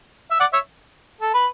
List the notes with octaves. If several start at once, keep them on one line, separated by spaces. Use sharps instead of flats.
E5
D5 F#5
C#5 E5
A4
B4